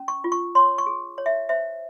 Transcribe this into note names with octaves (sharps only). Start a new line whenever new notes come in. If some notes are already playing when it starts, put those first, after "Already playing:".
Already playing: C#4
C#6
F4
C#6
C#5 C6
C#6
G#4
C#5
E5
C5 E5